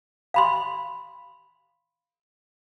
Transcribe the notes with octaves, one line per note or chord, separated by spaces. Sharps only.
F5 B5 C6